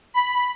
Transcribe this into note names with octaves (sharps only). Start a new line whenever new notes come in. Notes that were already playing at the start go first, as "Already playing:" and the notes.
B5